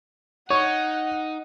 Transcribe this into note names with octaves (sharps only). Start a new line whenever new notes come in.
D#4 C#5 F#5